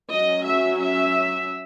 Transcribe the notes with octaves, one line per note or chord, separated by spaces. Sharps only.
F#3 C#4 D#5
E5
E5